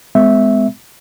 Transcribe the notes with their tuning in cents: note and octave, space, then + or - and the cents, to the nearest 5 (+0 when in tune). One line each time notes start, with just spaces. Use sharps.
G#3 +0 B3 +40 E5 -10